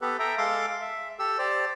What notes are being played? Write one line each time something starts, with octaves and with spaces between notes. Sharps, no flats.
B3 G4 A4 B4
A4 E5 G5 A#5
G#3 A4 F5 C6 D6
E5
G4 A4 E6
G4 C5 D5